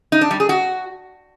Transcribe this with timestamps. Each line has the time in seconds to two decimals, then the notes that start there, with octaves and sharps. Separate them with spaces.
0.12 D#4
0.21 D4
0.31 G3
0.40 G#4
0.49 F#4